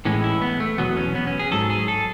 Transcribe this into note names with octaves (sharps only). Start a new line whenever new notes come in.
A2 E3 G#3 C#4
E4
B3
A3
E2 B2 F#3 B3
C#4
B3
C#4
G#4
G#2 F#3 A4
G#4
A4